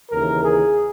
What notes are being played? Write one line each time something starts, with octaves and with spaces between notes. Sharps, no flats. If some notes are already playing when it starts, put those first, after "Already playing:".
D#2 C#3 E3 A#4
G#4